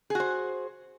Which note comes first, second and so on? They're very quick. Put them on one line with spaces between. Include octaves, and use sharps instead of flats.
G#4 F#4 C5